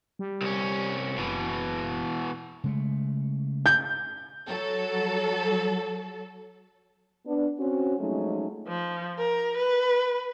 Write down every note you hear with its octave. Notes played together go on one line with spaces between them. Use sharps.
G3
C2 C#4
F#1 B2 E3
C#3 G#3 A3
G6
F#3 A4
B3 D4
C4 C#4 F#4
F3 F#3 G#3 A3 C#4 D#4
F3
A#4
B4